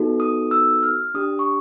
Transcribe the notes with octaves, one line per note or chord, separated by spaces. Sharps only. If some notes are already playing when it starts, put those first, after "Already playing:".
Already playing: B3 D#4 F#4 A4
D#6
E6
F6
D4 G4 D#6
C#6